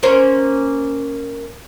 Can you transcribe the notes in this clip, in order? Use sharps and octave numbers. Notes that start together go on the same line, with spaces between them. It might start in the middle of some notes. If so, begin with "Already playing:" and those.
A#3 C#4 C5